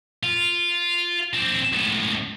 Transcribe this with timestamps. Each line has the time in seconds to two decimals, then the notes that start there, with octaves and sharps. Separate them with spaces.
0.23 F4
1.34 C4 D4
1.73 C#2 A2